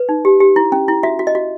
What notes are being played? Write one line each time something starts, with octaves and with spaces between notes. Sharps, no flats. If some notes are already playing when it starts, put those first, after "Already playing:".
Already playing: B4
D#4
G4
G4
E4
C#4
E4
F#4 E5
F#4
D#5
F#4